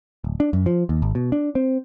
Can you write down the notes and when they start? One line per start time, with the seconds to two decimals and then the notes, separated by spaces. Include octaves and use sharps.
0.24 D1
0.40 D4
0.53 F#2
0.66 F3
0.89 D#2
1.02 G#1
1.15 B2
1.32 D4
1.55 C4